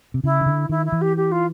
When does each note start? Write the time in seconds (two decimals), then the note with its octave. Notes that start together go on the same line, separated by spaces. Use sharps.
0.14 C3
0.24 C#3 E4
0.41 D#3
0.46 D3
0.69 D#3 E4
0.85 E4
0.92 E3
1.01 G4
1.16 G4
1.31 F4